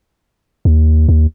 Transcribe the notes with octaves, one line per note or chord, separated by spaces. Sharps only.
D#2
D#2